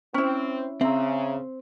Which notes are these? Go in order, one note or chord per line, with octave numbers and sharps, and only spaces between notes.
C4 C#4 E4
C#3 C4 E5 A#5